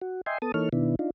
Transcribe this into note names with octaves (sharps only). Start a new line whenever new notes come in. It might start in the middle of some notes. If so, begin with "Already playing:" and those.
F#4
D#5 E5 G5 G#5 C6
B3 A4 A5 D#6
E3 A#3 D#4 A4 C#5 F6
B2 D#3 B3 D4 E4
D4 D#4 F4